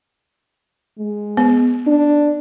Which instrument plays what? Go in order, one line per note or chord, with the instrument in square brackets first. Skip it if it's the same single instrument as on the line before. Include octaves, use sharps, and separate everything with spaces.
[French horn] G#3
[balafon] B3
[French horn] D4